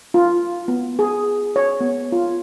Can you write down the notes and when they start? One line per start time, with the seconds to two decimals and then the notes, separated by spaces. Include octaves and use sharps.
0.14 F4
0.68 B3
0.99 G#4
1.56 C#5
1.81 B3
2.12 F4